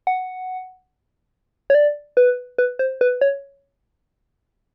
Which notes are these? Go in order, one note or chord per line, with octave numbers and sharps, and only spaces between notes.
F#5
C#5
D5
B4
B4
C5
B4
C#5